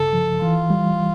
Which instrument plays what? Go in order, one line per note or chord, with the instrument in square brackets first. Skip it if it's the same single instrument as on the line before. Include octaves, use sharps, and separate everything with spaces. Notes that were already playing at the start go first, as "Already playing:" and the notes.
Already playing: [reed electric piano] G2 C#3 [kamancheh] A4
[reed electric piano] F3
[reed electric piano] E3 [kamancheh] F4
[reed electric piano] G3